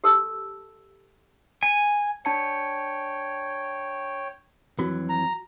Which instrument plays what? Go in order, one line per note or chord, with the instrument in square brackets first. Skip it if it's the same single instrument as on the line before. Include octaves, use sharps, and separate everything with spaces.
[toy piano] G4 A4 A5 E6
[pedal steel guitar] G#5
[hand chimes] D4 A5 C#7 [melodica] C#5 G5
[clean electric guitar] F2 E3 F#3 [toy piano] F4 F#4
[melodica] A#5